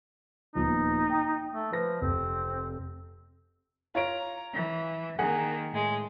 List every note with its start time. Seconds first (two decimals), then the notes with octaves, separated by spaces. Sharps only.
0.55 D#1 F3 B3 D#4
1.10 G5
1.53 A3
1.72 F3 B4 A#6
2.01 F1 C4
3.95 F4 C#5 A#5 D7
4.53 E3
5.19 D#3 A#3 G#4 F#5
5.71 A2 G#3